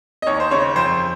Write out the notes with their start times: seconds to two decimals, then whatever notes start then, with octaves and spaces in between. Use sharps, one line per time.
0.22 D#5
0.27 D#2 C#5
0.40 C5
0.51 C#3 C#5
0.76 F2 C5